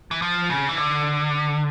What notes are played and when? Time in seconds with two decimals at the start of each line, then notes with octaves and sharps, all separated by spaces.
0.11 E3
0.22 F3
0.50 C#3
0.69 E3
0.77 D3